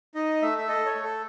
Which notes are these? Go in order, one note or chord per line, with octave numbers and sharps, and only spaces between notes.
D#4 D#5
A3 E5
E5
A4 D#5
C#5
A3
A4